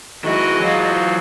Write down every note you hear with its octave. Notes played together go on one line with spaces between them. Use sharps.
D#3 G#3 E4 F#4 D#5
E3 F#3 F4